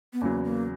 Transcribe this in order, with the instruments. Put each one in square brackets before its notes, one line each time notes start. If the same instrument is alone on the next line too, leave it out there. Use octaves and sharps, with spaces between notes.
[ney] B3
[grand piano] E2 C#3 F#3 [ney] A#3
[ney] A#3